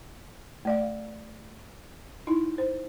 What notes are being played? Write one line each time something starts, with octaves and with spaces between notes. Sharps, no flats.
A3 D5 F5
D#4 E4
C5